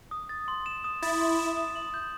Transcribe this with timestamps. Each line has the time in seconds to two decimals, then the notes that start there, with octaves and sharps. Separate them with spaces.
0.11 D#6
0.29 A6
0.48 C6
0.66 E7
0.84 D#6
1.02 E4 A6
1.20 C6
1.39 E7
1.57 D#6
1.76 F#7
1.94 G6